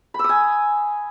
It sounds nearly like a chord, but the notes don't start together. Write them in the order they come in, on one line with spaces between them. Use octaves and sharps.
B5 E6 D#6 G#5